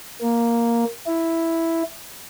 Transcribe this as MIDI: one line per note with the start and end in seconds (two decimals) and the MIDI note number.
0.21 0.85 58
1.07 1.83 64